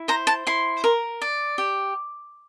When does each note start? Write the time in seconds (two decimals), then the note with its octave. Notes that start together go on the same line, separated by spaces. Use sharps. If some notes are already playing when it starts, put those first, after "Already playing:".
Already playing: E4
0.08 C5 A#5
0.27 A5
0.47 E4 C6
0.84 A#4
1.22 D5
1.58 G4